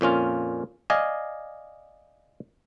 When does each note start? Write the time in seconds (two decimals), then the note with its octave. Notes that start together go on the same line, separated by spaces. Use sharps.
0.01 F2 A#2 C#4 F4
0.90 D5 D#5 F5 G#5